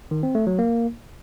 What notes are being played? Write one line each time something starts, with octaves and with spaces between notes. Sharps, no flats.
D#3
C4
A3
F#3
A#3